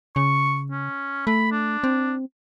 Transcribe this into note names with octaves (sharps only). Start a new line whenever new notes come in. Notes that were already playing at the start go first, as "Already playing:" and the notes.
C#3 C#6
C#4
A3 B5
D4
C4